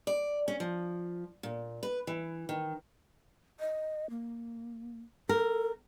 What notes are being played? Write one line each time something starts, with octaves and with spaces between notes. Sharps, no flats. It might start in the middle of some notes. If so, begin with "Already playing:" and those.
D5
C#4
F3
A#2
B4
E3
D#3
D#5
A#3
A4 A#4